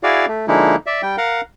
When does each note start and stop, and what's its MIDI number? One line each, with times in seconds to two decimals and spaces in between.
0.03 0.26 64
0.03 0.26 66
0.03 0.26 68
0.03 0.26 74
0.03 0.26 77
0.28 0.46 57
0.48 0.76 50
0.48 0.76 53
0.48 0.76 56
0.48 0.76 58
0.48 0.76 63
0.48 0.76 64
0.86 1.02 74
0.86 1.02 76
1.03 1.16 55
1.03 1.16 79
1.18 1.41 70
1.18 1.41 77
1.18 1.41 78